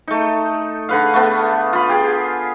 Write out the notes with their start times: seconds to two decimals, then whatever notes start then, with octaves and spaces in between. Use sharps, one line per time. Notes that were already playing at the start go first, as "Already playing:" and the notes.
0.08 A3 D#4
0.89 D3 B4 F5
1.14 A3 B3
1.73 F4 B5
1.89 G4 G#4